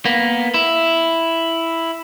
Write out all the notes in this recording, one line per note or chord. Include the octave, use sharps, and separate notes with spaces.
A#3 B3
E4